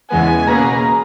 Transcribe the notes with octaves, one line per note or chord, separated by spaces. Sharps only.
E2 C#3 E3 G#3 B3 G#5
B2 A#3 C#4 G#4 B4 A#5